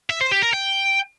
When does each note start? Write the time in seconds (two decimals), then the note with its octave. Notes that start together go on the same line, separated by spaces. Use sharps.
0.10 E5
0.21 C5
0.32 G4
0.43 A#4
0.54 G5